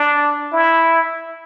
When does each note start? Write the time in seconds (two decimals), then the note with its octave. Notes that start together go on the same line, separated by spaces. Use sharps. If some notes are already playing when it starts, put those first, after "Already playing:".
Already playing: D4
0.53 E4